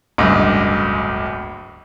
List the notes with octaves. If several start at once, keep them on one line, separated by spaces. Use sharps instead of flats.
D1 G1 C#2 D#5